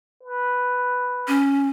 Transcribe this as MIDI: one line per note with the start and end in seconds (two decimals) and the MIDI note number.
0.23 1.39 71
1.28 1.69 61